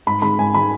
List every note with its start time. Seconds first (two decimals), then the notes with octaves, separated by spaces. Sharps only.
0.07 G#2 B5
0.22 D#3 G#3 B5
0.38 G#2 G#5
0.54 D#3 G#3 B5